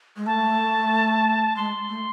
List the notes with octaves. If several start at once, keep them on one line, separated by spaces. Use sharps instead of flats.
G#3
A3 A5
G#3 C6
A3